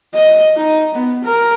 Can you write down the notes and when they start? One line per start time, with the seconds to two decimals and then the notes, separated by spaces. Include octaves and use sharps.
0.14 D#5
0.56 D#4
0.95 B3
1.24 A#4